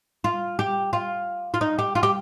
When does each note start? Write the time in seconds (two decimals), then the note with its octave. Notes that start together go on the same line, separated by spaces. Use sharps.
0.24 F4
0.59 G4
0.93 F4
1.54 F4
1.61 D#4
1.79 G4
1.95 F4
2.03 G4